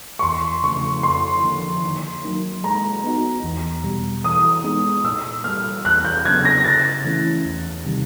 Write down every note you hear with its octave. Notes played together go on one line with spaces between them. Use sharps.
C#6
E2 C6
C#3 F3 A3 C#6
F2 C6
D3 F3 A#3
D#3
F#3 A#3 D#4
G#3 A#5
B3 D#4 F#4
E2
B2 G3
E3 D#6
G#3 B3 D#4 G#4
A#2 E6
G3 A#3 F6
E2 F#6
G6
C#3 F#3 B3 D4 G#6
A#6
C#3 A6
E3 A3 C#4 E4
E2
C3 D#3 G3